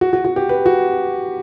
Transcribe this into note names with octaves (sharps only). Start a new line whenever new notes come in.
F#4
F#4
F#4
G4
B4
F#4